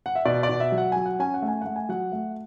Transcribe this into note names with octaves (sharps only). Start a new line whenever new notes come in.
F#5
E5
B2 D5
D5
B2
E5
F#3
F#5
F#3 G#5
F#5
C#4 G#5
F#5
A3
G#5
A3 F#5
G#5
F#3 F#5
A3